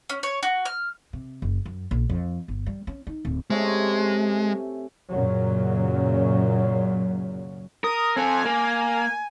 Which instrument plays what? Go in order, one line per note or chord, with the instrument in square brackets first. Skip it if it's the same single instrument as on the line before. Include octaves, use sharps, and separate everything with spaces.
[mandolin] C#4
C#5
F#4
F6
[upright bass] C3
F#1
F#2
A#1
F2
G1
G3
C#4
D#4
D1
[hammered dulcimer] C3 A3 C#4 [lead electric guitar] G#3
[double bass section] F#2 A#2 C#3 F#3
[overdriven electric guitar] A#4 [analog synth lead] D#6
[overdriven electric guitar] C4 A4 [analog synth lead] G#5
[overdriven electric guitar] A#3